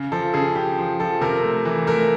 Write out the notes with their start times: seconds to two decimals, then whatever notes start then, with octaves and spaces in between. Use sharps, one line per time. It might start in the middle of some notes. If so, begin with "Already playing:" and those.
Already playing: C#3
0.12 F3 A4
0.34 C#3 G#4
0.55 C#3 G4
0.78 F3
1.00 F3 A4
1.21 C3 A#4
1.44 A3
1.65 E3
1.87 A3 A#4